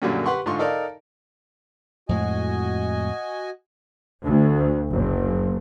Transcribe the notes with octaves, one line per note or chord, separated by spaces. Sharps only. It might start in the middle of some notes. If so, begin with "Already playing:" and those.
F#2 A#2 D3 F#3 G3 C#4
G4 B4 F#5 C6 C#6
G#2 D3 F4 C6 C#6
D#4 A4 A#4 D5 F5
F2 A2 G#3 F#4 D#5 G#5
D2
F#1